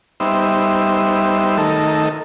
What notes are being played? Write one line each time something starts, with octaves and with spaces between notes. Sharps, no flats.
G3 B3 D#4 C5 E5
D#3 A3 D#4 A4 A#4